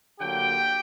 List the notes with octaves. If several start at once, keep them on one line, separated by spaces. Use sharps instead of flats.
D3 F#3 A#3 G4 G5